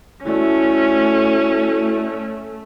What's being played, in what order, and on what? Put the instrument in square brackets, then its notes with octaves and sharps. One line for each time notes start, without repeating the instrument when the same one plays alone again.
[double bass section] A3 [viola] C#4 [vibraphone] E4 F#4 D5